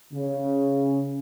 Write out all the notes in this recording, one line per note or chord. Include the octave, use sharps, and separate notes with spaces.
C#3